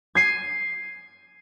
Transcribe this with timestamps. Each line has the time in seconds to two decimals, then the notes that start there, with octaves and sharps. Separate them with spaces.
0.15 G#6 C7 D#7